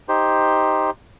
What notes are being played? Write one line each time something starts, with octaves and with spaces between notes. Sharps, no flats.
D#4 G4 C5